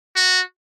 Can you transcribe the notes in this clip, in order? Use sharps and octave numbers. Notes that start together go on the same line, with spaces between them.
F#4